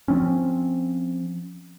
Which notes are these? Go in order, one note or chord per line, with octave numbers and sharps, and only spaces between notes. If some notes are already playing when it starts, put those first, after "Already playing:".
F3 C4 C#4